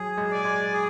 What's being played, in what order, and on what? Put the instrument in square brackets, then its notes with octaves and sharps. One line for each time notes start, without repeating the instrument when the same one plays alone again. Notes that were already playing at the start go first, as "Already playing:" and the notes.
Already playing: [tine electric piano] F#3 [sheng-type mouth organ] G#4
[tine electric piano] G#3
[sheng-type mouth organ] D5 G#5
[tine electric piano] G#3
[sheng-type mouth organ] G#4